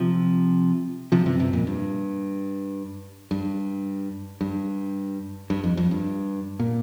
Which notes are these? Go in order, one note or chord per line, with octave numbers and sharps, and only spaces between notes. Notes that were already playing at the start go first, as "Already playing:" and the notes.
Already playing: C3 F3
C3 F3
G2 C3
G2 C3
F2 A#2
G2
G2
G2
G2
F2
F2
G2
A#2